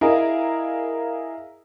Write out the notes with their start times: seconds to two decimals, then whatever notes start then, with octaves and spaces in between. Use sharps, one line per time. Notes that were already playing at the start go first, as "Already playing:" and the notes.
0.01 E4 G#4 A#4 D#5 F5